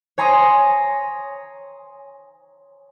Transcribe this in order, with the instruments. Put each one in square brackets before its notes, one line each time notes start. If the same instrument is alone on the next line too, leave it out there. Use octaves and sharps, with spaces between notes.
[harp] C#5 G#5 A#5 C6 D#6